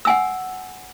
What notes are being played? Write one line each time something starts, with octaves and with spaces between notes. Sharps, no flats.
F#5 G#5 E6